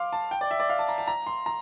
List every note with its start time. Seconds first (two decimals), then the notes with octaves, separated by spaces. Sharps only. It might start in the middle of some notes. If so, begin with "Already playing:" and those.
Already playing: F5 C6 D6
0.13 A5
0.31 G5
0.41 D5
0.51 E5
0.60 D5
0.70 F5
0.79 A5
0.89 A#5
0.98 A5
1.07 A#5
1.27 C6
1.46 A#5